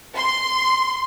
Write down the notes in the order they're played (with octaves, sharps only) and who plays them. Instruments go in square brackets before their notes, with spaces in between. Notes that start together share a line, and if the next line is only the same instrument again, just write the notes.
[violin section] C6